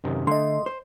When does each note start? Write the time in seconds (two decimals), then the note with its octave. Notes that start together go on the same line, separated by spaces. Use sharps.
0.04 F#2 C3 D#3
0.27 D3 A3 D#5 C6
0.66 C5